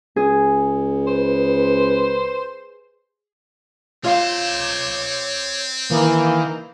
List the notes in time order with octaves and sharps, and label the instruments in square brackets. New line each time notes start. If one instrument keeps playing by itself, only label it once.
[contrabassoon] C#2 [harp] G#4
[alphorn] B4 [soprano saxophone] C5
[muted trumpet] C4 [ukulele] F4 F5 [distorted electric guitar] C#5 C6
[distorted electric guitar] D#3 D#4 [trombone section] E3 A#3